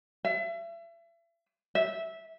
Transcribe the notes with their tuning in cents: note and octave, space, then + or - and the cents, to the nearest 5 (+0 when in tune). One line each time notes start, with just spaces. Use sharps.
E5 +35
E5 -10